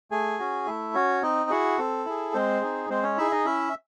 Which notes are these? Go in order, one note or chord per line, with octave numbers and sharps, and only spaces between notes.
A3 G#4 G#5
C#4 F#4
A3 E4 E5
C#4 F#4 C#5
C4 D#4 D#5
E4 F#4 G#4 F#5
C4 A4
E4 G#4
G#3 C4 C5
D#4 G#4
G#3 C4 C5
C#4 C#5
D#4 E4 G#4 E5
D#4 D#5
C#4 E4 E5